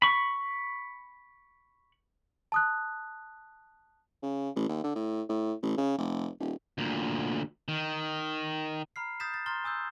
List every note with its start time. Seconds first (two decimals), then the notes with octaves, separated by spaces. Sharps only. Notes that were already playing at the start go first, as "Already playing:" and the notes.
0.02 B5 C#6
2.52 A5 D#6 F#6
4.22 C#3
4.56 A1
4.69 D#2
4.84 D3
4.95 A2
5.29 A2
5.62 A1
5.77 C#3
5.98 F1
6.40 D#1
6.78 D2 A#2
7.68 D#3
8.96 A#5 B5 F6 C7
9.20 D#6 G6 A6 B6 E7
9.34 A6
9.46 A#5 C6 F6 A6 G7
9.64 G#5 D#6 E6 G6